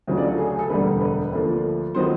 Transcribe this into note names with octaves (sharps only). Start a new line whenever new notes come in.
D2 C#3 F#3
D5
A4
G#4
G#4
A4
E1 D2 D3 G3 B3 B4
B4
D2 D3 F3 A#3
D#3 F#3 B3 C5